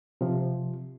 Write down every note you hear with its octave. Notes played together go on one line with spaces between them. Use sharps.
C3 F3